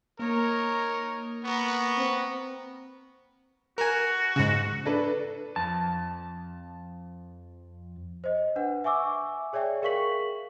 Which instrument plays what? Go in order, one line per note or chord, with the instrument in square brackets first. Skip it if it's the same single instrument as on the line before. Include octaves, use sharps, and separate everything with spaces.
[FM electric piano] A#3 [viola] D#4 C#5 [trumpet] A#4
[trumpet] B3 [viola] A#4 C#6
[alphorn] C4
[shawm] F#4 [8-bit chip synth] A#4 G#5
[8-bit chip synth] G#2 C#3
[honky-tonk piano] D4 A4 B4
[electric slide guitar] F2 A5
[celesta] C5 D#5
D4 B4 F#5
E5 G#5 C#6 D6 E6
G#4 C#5 D5 E5 G5
G#4 A#4 F5 C#6 B6 F#7